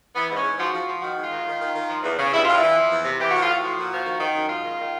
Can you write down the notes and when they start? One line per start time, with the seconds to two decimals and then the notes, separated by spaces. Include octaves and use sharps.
0.15 E3 B3
0.30 G#2
0.36 C#4
0.44 G#2
0.58 F3 F#4
0.73 F3
0.88 F3
1.02 D#3 F#4
1.17 G#2
1.23 F4
1.30 D#3
1.46 D#3
1.60 D#3
1.75 D#3
1.88 F3
2.03 E2
2.17 C#3
2.32 G2 E4
2.45 G2 F4
2.56 E4
2.62 E3
2.76 F3
2.90 E2
3.04 C3
3.19 E3 G4
3.31 A2 F#4
3.42 F4
3.48 A2
3.55 F#4
3.62 F3
3.78 A#2
3.92 F3
4.06 D#3
4.20 D#3
4.34 F#2
4.49 G#2 F4
4.64 D#3
4.79 D#3